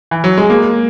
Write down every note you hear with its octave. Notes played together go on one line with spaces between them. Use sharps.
E3
F#3
G#3
A#3